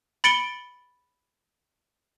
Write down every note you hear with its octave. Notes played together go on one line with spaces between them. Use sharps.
B5 A6 C#7 D7 G7